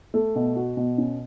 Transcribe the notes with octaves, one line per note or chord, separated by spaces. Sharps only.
A3
B2
F#4
B2
C#4